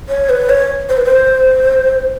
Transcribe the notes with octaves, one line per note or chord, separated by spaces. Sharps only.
C#5
B4
C#5
C5
B4
C5